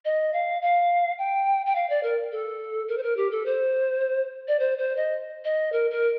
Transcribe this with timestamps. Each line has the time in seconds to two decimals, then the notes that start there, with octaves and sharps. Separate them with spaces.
0.05 D#5
0.33 F5
0.62 F5
1.18 G5
1.66 G5
1.75 F5
1.90 D5
2.03 A#4
2.32 A4
2.88 A#4
2.98 C5
3.03 A#4
3.17 G4
3.31 A4
3.46 C5
4.48 D5
4.59 C5
4.78 C5
4.97 D#5
5.44 D#5
5.72 A#4
5.91 A#4